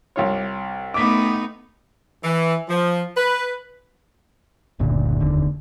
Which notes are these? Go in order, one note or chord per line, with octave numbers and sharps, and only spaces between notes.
C2 F4 C#5
A3 B3 D#4 D6 B6
E3
F3
B4
F#1 D2 A#2
F1 D#2 D3